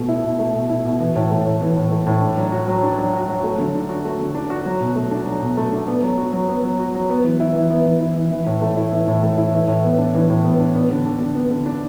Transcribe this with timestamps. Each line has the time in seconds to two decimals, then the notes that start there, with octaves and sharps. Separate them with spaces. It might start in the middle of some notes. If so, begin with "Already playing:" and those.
Already playing: B2 A3
0.09 E4
0.24 B2
0.39 A3
0.54 B2
0.70 E4
0.85 B2
1.00 E3
1.15 A2
1.31 A3
1.45 A2
1.61 E3
1.77 A2
1.91 A3
2.07 A2
2.22 D4
2.37 F#3
2.52 F#4
2.67 F#3
2.83 D4
2.98 F#3
3.13 F#4
3.29 F#3
3.44 A3
3.58 D3
3.75 D4
3.89 F#4
4.05 A3
4.20 D3
4.35 D4
4.50 F#4
4.66 F#3
4.81 B2
4.96 A3
5.11 D4
5.27 F#3
5.42 B2
5.57 A3
5.72 D4
5.88 B3
6.03 F#3
6.18 F#4
6.33 F#3
6.48 B3
6.64 F#3
6.79 F#4
6.94 F#3
7.10 B3
7.24 E3
7.40 E4
7.55 E3
7.70 B3
7.86 E3
8.01 E4
8.16 E3
8.31 E3
8.46 A2
8.62 A3
8.77 E4
8.93 E3
9.08 A2
9.23 A3
9.38 E4
9.53 E3
9.68 A2
9.84 B3
9.98 D4
10.14 E3
10.30 A2
10.45 B3
10.60 D4
10.75 B3
10.90 D3
11.06 D4
11.21 D3
11.35 B3
11.51 D3
11.66 D4